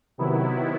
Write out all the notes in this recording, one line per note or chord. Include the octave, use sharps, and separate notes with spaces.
C3 D#3 F#3 B3 E4